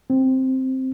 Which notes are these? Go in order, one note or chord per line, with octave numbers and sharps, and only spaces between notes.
C4